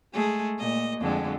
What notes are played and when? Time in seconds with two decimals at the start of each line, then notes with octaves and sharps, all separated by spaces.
0.13 G#3 A3 G#4
0.58 A#2 D#5
1.00 F2 D3 G#3